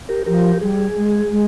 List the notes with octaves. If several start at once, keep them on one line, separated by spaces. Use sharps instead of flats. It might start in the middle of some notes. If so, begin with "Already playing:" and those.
G4 A#4
F3 G4 A#4
G3 G#4
G#3
G#3